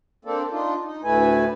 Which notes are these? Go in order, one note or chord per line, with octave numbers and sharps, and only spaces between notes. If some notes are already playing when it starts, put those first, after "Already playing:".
A#3 C4 D4 A4
D4 D#4 F4
D#4
D2 A2 A3 E4 B4 G#5